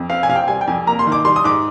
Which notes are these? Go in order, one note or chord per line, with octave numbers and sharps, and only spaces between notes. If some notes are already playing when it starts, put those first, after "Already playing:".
Already playing: F2
C4 F5
G#5
C3 F5
G5
G3 G#5
G5
F2 G#5
A#3 A#5
C6
D#3
D6
G3 C6
D#6
G#2 D6